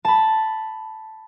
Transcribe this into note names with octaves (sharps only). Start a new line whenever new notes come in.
A5 B5